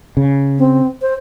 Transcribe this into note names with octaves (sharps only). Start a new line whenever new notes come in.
C#3
C4
C5